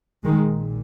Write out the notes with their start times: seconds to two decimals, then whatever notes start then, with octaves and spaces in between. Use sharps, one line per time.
0.24 A#1 A#2 D#3 G#3